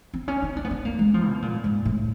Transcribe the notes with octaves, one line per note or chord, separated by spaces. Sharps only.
C4
C#4
D#4
D4
B3
C4
A#3
G#3
F3
B2
A#2
G#2
A2